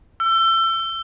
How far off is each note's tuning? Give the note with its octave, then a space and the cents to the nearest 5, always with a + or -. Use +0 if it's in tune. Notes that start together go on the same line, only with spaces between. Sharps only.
E6 +30